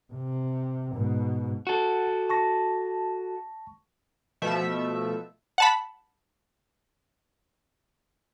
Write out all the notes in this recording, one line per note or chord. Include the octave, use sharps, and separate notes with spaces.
C3
G#2 B2
F#4 A4 F#5
A5 C#6 A#6
B2 F3 A3 E5
F#5 A5 B5